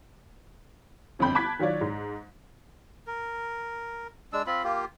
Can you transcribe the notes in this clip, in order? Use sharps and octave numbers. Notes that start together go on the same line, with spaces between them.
G1 F2 D3 G5 B5 G6
A5 B5 D6 F#6 G#6 B6
D#3 F#3 F4 C#5 D5
G#2
A#4
G#3 D4 E6
C4 F4 B5
A#3 F4 G4